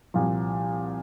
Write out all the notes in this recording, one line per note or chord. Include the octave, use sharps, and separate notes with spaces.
C2 A#2 F3